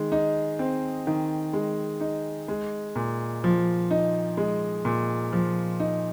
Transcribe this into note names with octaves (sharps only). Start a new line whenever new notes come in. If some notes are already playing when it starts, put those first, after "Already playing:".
Already playing: D#3 G#3
D#4
C4
D#3
G#3
D#4
G#3
A#2
F3
D#4
G#3
A#2
F3
D#4